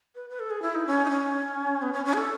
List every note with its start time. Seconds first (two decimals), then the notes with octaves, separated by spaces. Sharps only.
0.15 B4
0.30 B4
0.40 A4
0.50 G#4
0.62 E4
0.75 D#4
0.87 C#4
1.05 D#4
1.10 C#4
1.82 B3
1.93 C#4
2.05 C#4
2.13 G#4
2.18 A4